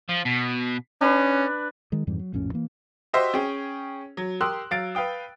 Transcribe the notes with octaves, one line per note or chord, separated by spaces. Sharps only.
F3
B2
C#4 D4 B4
D#3 G#3
F2 G#2 E3 G3
F#3
A#1 F2 A2 C#4
E3 A#3
F#4 G4 C5 D#5 E5 G5
C#4 G#4 G5
F#3
G4 A#4 C6 D#6 E6 F#6
F#3 F5 A6 D7
B4 F5 G5 D#6